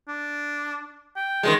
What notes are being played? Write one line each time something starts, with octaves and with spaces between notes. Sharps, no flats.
D4
G5
D#3 F#3 G#3